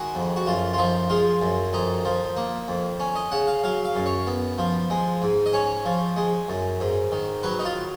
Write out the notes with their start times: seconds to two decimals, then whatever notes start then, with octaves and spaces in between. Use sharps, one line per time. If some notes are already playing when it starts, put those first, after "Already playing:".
Already playing: D#3 G#3 F#4
0.15 F2
0.36 F#4
0.47 F#2 F4
0.73 F4
0.78 F3 D#4
1.10 G#3 F4
1.42 F#2
1.73 F2 D#4
2.05 F3
2.37 A#3
2.68 F2
3.00 C#4
3.15 D#5
3.32 C#3 F#5
3.47 F5
3.64 F#3 F5
3.85 F5
3.96 F#2
4.06 C#5
4.27 B3
4.58 F3
4.90 G#3
5.22 G#2
5.46 D#5
5.53 C#4 C#5
5.85 F3
6.16 G#3
6.49 F#2
6.80 G#2
7.12 D#3
7.43 F#3 B4
7.59 D#4
7.65 F4